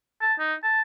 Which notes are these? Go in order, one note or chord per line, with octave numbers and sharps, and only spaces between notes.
A5
D#4
A5